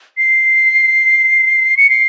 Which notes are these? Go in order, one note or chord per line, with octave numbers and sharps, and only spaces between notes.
C7
C#7
C7